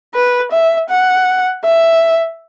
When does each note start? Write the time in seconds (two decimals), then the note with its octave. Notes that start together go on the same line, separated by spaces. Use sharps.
0.15 B4
0.52 E5
0.89 F#5
1.64 E5